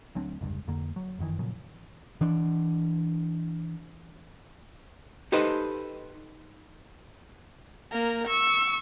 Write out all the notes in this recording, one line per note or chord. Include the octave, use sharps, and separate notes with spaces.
D2 F#3 C4 D4
F1 C#2 G2
F2 D3 A#3
F#3
G1 F#2 D#3 E3
A#2 C#3 F3 F#3
E3 D4
D#4 G4 A4 B4 C5 D#5
A#3 A#4
C#6 E6